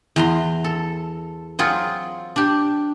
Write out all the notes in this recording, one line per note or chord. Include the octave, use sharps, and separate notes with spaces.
E2 A#5 C6
A4
F#3 C4 F4 G#4
D4 G4